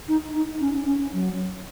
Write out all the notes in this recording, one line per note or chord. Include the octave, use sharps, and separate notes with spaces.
D#4
D#4
C#4
C#4
F#3